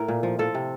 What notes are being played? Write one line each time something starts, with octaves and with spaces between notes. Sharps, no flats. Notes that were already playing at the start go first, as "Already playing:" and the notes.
Already playing: A2 A#4
A#2
F3
F3 A4
C3